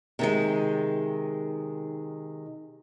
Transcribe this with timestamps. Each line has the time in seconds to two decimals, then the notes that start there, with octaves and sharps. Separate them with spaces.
0.19 C3 D#3 G#3